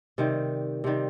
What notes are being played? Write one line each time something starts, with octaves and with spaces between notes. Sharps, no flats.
C3 D#3 G3
C3 D#3 G3